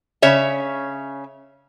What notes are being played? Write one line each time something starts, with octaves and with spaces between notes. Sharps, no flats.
C#3 C#5 E5